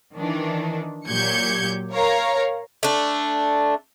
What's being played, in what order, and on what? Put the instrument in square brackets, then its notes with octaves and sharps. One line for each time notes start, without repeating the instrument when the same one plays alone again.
[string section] D#3 E3 D4
A#2 F#3 G4 G6 G#6 C#7
A#4 C#5 F5 A#5
[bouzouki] A3 D4